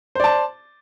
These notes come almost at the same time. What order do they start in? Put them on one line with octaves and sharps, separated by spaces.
C5 D5 A5